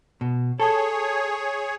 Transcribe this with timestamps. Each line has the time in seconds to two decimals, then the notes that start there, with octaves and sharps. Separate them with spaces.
0.21 B2
0.60 G#4 A4 C#5